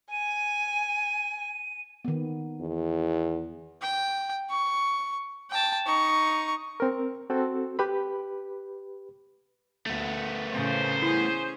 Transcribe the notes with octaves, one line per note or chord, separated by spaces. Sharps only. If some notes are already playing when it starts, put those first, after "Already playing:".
G#5 D#7
D#3 B3
E2
G5
C#6
G5 A5
D#4 C#6
C4 A#4
C4 F#4 A4
G4 B4 B5
D2 A3 B3
A2 C#3 C5
C#4 E4 G#4